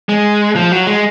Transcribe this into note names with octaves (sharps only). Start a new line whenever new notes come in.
G#3
F3
F#3
G#3